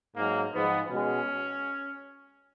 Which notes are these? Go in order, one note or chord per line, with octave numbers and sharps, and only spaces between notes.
G#2 F#3 A#3
G#2 F3 G#3 B3
B2 G#3 C#4